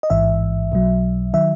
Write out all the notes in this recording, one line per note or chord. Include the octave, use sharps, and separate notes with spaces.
D#5
A1 G#2 E3 E5
B1 B2 F#3
D#3 F#3 E5